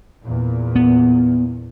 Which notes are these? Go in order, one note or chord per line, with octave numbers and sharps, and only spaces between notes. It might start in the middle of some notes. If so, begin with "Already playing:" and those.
E2 A#2
B3